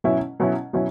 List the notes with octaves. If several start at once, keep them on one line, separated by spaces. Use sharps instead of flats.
B2 F#3 C#4 E4
B2 F#3 C#4 E4
B2 F#3 C#4 E4